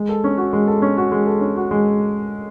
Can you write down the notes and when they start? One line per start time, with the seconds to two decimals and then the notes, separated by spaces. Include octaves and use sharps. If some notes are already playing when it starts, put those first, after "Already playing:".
Already playing: G#3
0.09 A4
0.24 C#4
0.38 F#4
0.53 G#3
0.68 A4
0.82 C#4
0.97 F#4
1.12 G#3
1.27 A4
1.41 C#4
1.56 F#4
1.71 G#3